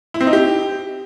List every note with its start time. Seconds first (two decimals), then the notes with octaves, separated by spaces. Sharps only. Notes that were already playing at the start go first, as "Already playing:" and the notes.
0.14 E4
0.21 C4
0.27 D#4
0.33 G4